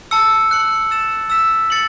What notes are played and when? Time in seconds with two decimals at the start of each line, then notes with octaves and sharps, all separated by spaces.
0.11 A5 E6 C#7
0.51 F#6 C#7 F#7
0.91 E6 A6 E7
1.30 E6 B6 E7
1.70 A6 C#7 F#7